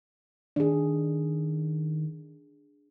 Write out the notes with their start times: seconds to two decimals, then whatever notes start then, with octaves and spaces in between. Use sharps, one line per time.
0.56 D#3 D4 G#4